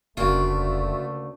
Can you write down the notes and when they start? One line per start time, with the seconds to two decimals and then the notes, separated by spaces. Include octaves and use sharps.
0.17 F1 D2 C#3 A3 A#3 D4 F4 F#4